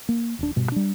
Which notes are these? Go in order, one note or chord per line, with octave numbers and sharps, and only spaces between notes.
A#3
D#1 D4
G2 B2
G3 D4